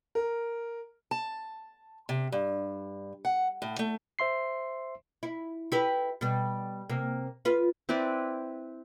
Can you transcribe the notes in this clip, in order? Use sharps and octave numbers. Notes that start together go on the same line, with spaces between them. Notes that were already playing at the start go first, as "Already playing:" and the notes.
A#4
A5
C3
G2
F#5
A2
A3
C5 E5 C6 C7
E4
E4 G4 B4
B2 G3
C3 A#3
F4 B4
C4 E4 B4 D5